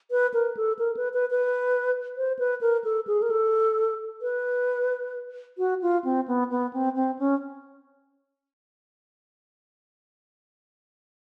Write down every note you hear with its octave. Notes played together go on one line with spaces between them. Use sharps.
B4
A#4
A4
A#4
B4
B4
B4
C5
B4
A#4
A4
G#4
A#4
A4
B4
F#4
F4
C4
B3
B3
C4
C4
C#4